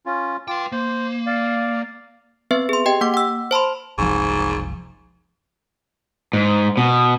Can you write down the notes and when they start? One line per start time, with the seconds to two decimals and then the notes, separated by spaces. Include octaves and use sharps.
0.06 C#4 F4
0.48 F4 B4 G5 D6
0.72 A#3 C5
1.26 D5 F5
2.51 B3 C4 B4 E5
2.69 G#4 C6
2.86 G4 D#5 G5 C6
3.01 A#3 F#5 D6
3.14 F#5 E6
3.51 C5 A5 B5 C6
3.98 F#1 C2 G#2 F3
6.33 G#2
6.77 B2